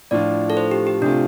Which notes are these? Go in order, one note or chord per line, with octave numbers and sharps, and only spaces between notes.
A2 F3 D4 F4 D5
A4
C5
G4
G4
C3 A3 D4 F4